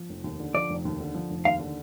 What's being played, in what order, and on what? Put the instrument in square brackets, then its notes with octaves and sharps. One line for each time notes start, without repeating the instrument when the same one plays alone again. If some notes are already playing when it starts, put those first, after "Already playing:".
Already playing: [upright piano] F3
F1
D#2
D3
[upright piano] F3 [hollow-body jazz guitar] D5
[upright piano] F1
D#2
D3
F3
F1
[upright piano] D#2 [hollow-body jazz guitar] F5
[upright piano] D3